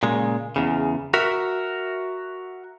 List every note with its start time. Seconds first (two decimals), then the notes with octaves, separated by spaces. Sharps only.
0.03 A#2 C#3 G#3
0.56 E2 C#3
1.14 F#4 A#4 E5